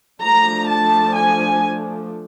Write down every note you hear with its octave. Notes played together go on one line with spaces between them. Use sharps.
F3 A3 D4 A#5
A5
G#5